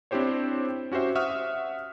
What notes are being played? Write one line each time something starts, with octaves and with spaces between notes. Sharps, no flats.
C4 D4 E4 G4 C5 C#5
C#4 F#4 G4 C5 E5
E5 F#5 C#6 D#6 F6